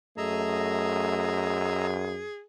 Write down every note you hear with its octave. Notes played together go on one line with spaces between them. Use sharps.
F#2 A3 G#4 D#5 A#5 E6